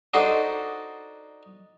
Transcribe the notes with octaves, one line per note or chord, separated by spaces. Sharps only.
D4 D#4 F#4 A4 C5